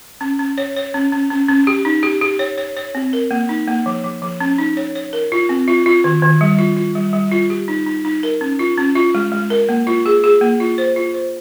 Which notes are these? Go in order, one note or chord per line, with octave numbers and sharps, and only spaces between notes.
C#4
C#4
C#5
C#5
C#4
C#4
C#4
C#4
G4
D#4
G4
G4
C#5
C#5
C#5
C4
A#4
A#3
D#4
A#3
F3
F3
F3
C#4
D#4
C#5
C#5
A#4
F4
C4
F4
F4
D#3
D#3
G3
F4
F4
G3
G3
F4
G4
D#4
D#4
D#4
A#4
C#4
F4
C#4
F4
G#3
G#3
A#4
A#3
F4
G#4
G#4
A#3
F4
C5
F4
C5